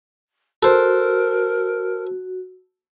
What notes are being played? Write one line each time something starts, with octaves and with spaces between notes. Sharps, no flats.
F#4 A4 A#4 C5